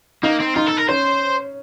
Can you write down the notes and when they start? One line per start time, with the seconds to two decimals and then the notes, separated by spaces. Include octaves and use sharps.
0.23 A#3 D#4
0.40 C4
0.56 D#4 F4
0.67 A4
0.78 A#4
0.89 C#4 C5